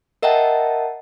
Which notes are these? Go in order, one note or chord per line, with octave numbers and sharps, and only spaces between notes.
A#4 D#5 E5 F#5 G5 A5